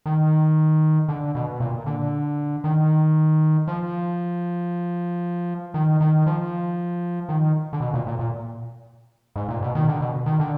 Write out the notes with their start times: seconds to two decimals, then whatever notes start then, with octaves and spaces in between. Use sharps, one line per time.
0.06 D#3
1.09 D3
1.35 B2
1.60 A#2
1.86 D3
2.64 D#3
3.68 F3
5.74 D#3
6.01 D#3
6.26 F3
7.29 D#3
7.73 D3
7.80 B2
7.94 A#2
8.07 A#2
8.19 A#2
9.36 G#2
9.49 A#2
9.62 B2
9.75 D#3
9.88 D3
10.00 B2
10.26 D#3
10.40 D3